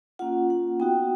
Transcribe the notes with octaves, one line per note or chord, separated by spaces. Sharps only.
A#3 C#4 F4 F#5
F#5
B3 D#4 F#4 G5